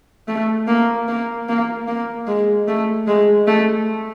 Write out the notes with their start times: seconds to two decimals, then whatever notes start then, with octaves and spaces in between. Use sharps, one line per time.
0.28 A3
0.68 A#3
1.08 A#3
1.49 A#3
1.88 A#3
2.27 G#3
2.68 A3
3.08 G#3
3.47 A3